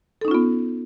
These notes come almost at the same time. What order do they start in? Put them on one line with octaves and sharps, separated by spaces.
A4 D#4 C#4 F4 B3